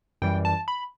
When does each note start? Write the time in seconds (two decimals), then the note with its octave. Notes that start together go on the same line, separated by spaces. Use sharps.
0.22 F#2 E3 G3 G5
0.45 A5
0.68 B5